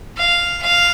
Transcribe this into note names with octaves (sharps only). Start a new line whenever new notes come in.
F5
F5